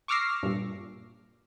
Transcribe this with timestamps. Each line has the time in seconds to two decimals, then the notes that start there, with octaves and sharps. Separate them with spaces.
0.08 C#6 D6 E6 F6 A#6 C7
0.43 G2 A#2